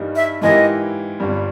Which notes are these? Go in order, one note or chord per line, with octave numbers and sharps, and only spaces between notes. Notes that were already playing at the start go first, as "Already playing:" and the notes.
Already playing: G2 E3 G3 A#3 D#4
E5
G#2 E3 A#3 E4 G4 D#5
G1 G2 G3